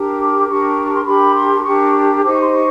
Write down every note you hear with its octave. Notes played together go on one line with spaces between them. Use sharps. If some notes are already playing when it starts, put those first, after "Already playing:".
Already playing: D4 G4 A#4
D6
D4 G4 A#4 C#6
C#6
C6
D4 G4 A#4 B5
C6
D4 G4 A#4 C#6
D#4 G4 C5 D6
C#6
C6
C#6